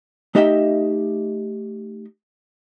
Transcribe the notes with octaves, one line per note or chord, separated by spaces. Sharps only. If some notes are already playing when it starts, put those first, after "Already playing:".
A3 D#4 G4 D#5 E5 G5